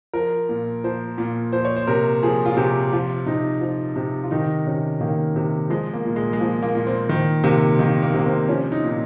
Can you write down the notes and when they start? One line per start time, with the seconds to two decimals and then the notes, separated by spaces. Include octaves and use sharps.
0.13 F3 A#4
0.49 A#2
0.84 F3 C5
1.18 A#2
1.53 F3 C5
1.65 C#5
1.76 C5
1.87 C3 A#4
2.23 F3 G#4
2.46 F4
2.57 C3 G4
2.93 F3 F4
3.26 C3 D#4
3.61 F3
3.96 C3
4.24 F4
4.31 D#3 D#4
4.67 C3 C#4
5.01 D#3 A#3
5.36 C3
5.70 F3 G#3
5.93 A#3
6.05 A#2
6.16 G#3
6.33 G#3
6.40 F3 A#3
6.63 A#3
6.75 A#2
6.87 C4
7.09 D#3
7.44 C3 A#3
7.79 D#3 A#3
8.03 A#3
8.14 C3
8.19 A#3
8.26 C4
8.48 F3 C#4
8.72 D#4
8.84 A#2 D#4